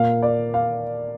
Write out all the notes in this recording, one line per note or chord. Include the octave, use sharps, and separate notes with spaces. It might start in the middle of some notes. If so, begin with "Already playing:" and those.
Already playing: A#2 A#3 F5
D5
F5